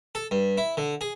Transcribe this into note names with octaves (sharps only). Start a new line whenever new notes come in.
A4
G2
E4
D3
G#4